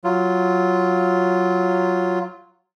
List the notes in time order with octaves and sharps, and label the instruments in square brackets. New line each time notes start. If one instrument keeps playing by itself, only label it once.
[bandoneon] F#3 F4